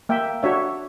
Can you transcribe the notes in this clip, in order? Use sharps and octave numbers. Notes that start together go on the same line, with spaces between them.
A#3 E5 G5
D4 F#4 C#5 E5